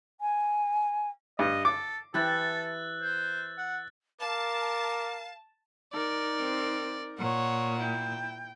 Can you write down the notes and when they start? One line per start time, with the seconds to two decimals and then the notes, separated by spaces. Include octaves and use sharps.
0.20 G#5
1.39 G2 D#5
1.65 A4 D6
2.14 E3 E4 G4 A4 E6 F#6 A6
3.02 C5
3.58 F#5
4.21 A#4 F5 A5 D6
5.93 D#4 A#4 D5
6.40 C4
7.18 A#2 C#5 F#5
7.80 E4 G5